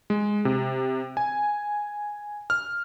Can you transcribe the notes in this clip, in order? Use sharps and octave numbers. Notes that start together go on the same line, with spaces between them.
G#3
C3
G#5
F6